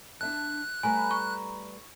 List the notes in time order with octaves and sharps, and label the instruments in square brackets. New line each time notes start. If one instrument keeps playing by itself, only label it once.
[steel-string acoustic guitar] D4 E5 A5 [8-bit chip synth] F#6
[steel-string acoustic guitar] G3 A3 B4 [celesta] G#5 [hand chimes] A#5 B5
[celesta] C#6